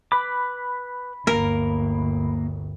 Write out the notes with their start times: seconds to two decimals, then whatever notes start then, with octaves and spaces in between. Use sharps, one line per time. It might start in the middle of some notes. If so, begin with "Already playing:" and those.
0.12 B4 B5 D6
1.27 G1 D2 A#3 A#4